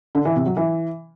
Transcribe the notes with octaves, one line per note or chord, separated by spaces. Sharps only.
D3
E3
C3
F#3
E3